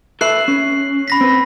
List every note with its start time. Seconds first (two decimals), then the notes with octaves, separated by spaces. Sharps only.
0.21 A4 B4 E5 F#6 C7 F#7
0.48 C#4
1.08 B5 A#6 B6
1.21 C4 B4